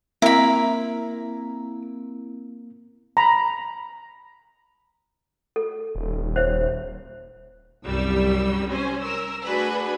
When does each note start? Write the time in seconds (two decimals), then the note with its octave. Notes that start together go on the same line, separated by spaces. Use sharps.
0.22 A#3 C4 E4 A#4 E5 B5
3.17 A#5 B5
5.56 A4
5.95 D#1
6.36 C5 C#5 E5
7.83 C2 F#2 G3 E6
8.69 C#4 C5 G#5
9.03 A#4 E6
9.45 A3 D4 F#4 G#4 B4